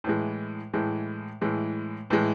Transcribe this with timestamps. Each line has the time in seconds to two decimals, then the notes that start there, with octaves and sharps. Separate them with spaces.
0.04 A2 E3 G#3
0.73 A2 E3 G#3
1.41 A2 E3 G#3
2.10 A2 E3 G#3